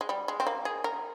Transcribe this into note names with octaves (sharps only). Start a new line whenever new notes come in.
G#3
G3
G#3
C4
A#3
G#4
A#4